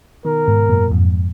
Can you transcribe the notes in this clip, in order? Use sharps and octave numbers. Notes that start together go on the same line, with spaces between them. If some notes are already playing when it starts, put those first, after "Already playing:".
B2 D#3 A#4
G#2 B2
F#2 A#2
F2 G#2